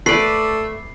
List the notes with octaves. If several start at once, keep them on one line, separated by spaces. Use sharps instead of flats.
A3 B4 D5 C7